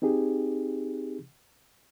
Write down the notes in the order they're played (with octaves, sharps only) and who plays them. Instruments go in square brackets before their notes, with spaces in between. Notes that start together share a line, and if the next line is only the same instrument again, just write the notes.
[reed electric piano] C4 D#4 G4 G#4